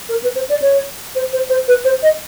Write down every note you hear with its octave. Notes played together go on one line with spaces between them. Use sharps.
A#4
B4
C5
D5
C#5
C5
C5
C5
B4
C5
D#5